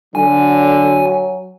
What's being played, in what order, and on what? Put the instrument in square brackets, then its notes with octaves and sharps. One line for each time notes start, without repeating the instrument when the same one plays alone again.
[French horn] D3 [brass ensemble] F#3 [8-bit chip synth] G#5